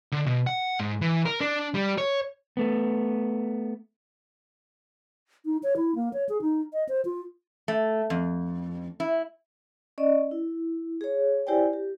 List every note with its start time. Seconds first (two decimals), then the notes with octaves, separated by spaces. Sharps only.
0.12 D3
0.26 B2
0.47 F#5
0.80 G#2
1.01 E3
1.25 A#4
1.41 D4
1.75 G3
1.98 C#5
2.57 A3 B3
5.45 D#4
5.63 C#5
5.77 E4
5.95 A#3
6.13 C#5
6.29 G#4
6.42 D#4
6.73 D#5
6.89 C5
7.05 F4
7.68 A3
8.10 F2
9.00 E4
9.98 C#4 D5 D#5
10.31 E4
11.01 G#4 C#5
11.46 E4 G4 C5 D5 G5 G#5
11.73 G4